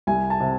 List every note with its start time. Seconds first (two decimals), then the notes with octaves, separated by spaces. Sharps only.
0.07 C2 G#5
0.30 A5
0.40 C3